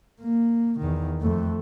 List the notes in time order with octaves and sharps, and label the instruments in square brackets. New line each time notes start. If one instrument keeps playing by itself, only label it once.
[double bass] A#3
E2 D#3
F2 A3